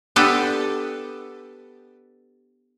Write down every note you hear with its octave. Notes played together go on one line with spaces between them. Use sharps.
B3 D4 G4 A4 B4